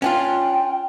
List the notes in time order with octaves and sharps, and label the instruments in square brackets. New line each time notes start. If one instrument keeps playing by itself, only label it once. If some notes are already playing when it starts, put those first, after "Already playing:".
[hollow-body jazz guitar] C#4 D4 F4 [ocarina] G5